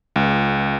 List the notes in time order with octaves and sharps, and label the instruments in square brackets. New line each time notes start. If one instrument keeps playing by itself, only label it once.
[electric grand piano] C#2